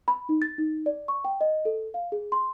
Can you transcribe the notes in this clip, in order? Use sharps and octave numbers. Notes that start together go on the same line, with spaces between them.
B5
D#4
A6
D#4
D5
C#6
G5
D#5
A4
F5
G#4
C6